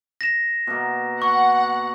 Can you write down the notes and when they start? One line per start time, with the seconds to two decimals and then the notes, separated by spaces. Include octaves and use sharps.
0.21 A#6 E7
0.67 B2 A#3
1.22 F#5 C#6